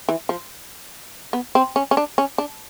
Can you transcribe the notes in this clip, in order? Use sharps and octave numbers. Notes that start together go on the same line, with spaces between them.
E3
F3
B3
C4
C#4
C#4
D4
C#4
D4